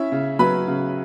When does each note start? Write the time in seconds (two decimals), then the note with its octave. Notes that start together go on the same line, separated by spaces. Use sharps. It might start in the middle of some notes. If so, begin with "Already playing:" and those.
Already playing: C#4 E4 E5
0.12 C#3
0.39 F#3 B4 B5
0.68 C#3